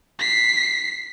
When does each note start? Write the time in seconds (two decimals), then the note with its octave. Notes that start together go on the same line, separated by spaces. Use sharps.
0.19 B6 C7